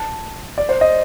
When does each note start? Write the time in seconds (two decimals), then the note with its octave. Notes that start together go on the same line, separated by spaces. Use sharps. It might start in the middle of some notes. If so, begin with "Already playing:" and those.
Already playing: A5
0.58 D5
0.69 C5
0.81 D#5